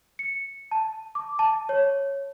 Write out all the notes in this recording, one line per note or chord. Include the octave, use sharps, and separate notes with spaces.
C#7
A5
D6
A5
C#5